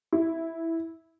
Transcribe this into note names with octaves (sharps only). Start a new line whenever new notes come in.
E4